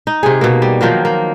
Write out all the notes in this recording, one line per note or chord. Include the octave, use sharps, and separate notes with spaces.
D#4
C3 G#4
B2 A#3
G3
D#3 F3 F#3 A#3
A#3